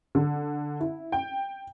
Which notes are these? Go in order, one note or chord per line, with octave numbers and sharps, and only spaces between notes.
D3
E4
G5